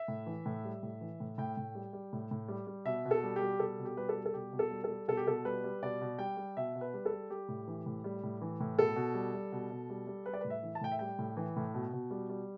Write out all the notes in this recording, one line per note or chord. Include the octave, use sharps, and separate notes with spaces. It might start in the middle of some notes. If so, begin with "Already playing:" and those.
Already playing: E5
A2
E3
A2
G3
A2
E3
A2
A2 G5
A2
G3
G3
A2
A2
G3
G3
B2 E5
B2
A4
G3
G4
G3
B2 A4
B2
G4
G3 B4
A4
G3
A4
B2 G4
B2
A4
G3
A4
G3
B2 A4
G4
B2 A4
G3 B4
G3
B2 D5
B2
G3 G5
G3
B2 E5
B2
B4
G3
A4
G3
G3 G4
A2
E3
A2
G3
A2
E3
A2
B2 A4
B2
G3
G3
B2
B2
G3
G3
G3 B4
D5
A2 B4
E5
E3
A5
A2 G5
E5
G3 G5
A2
E3
A2
B2
B2
G3
G3